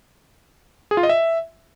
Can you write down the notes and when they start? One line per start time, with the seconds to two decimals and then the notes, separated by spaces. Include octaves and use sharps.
0.91 G#4
0.97 F4
1.03 D#5
1.09 E5